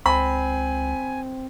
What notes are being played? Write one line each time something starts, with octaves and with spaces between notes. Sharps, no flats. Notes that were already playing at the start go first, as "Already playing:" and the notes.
C#2 C4 G#5 B5